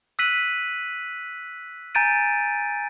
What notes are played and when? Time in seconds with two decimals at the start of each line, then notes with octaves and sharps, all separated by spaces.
0.19 E6 F#6 B6 D#7 F#7
1.95 G#5 A#5 G6 A6 D7 D#7